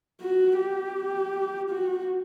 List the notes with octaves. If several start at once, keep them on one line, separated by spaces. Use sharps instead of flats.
F#4
G4
F#4